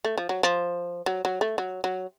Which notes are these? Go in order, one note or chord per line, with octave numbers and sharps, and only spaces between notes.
A3
F3
F#3
F3
F#3
F#3
A3
F#3
F#3